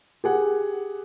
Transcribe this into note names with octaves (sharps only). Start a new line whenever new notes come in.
G4 G#4 F#5